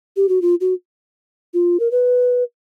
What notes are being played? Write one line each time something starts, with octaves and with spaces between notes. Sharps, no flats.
G4
F#4
F4
F#4
F4
A#4
B4